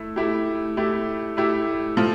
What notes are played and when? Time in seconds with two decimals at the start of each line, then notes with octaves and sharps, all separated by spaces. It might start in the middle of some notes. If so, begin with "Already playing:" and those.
Already playing: A3 E4
0.16 A3 E4 G4
0.77 A3 E4 G4
1.37 A3 E4 G4
1.97 F3 A3